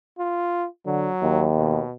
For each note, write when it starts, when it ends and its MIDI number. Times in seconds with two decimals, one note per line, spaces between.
0.19 0.67 65
0.86 1.08 50
0.86 1.49 54
1.22 1.81 39
1.57 1.95 47